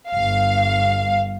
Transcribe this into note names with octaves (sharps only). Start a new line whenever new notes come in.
G1 F5